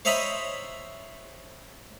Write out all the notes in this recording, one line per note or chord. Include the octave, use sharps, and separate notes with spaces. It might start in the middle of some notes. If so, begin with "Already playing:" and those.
C5 C#5 D#5 E5 A#5 B5